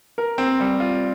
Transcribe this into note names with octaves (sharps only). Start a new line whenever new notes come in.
A#4
C4
G3
F4